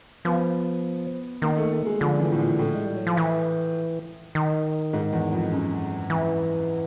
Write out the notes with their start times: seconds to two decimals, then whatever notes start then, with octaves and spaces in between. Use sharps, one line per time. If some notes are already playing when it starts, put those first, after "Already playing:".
0.25 F3 B3
1.42 D#3 A#3
1.57 A3
1.71 A3
1.85 G#3
2.00 D3 F3
2.20 E3
2.32 A2
2.39 A#2
2.59 A2
2.75 G#3
2.85 G3
2.96 F#3
3.07 F3
3.17 E3
4.35 D#3
4.93 G#2
5.13 E2
5.33 F2
5.52 F#2
6.10 E3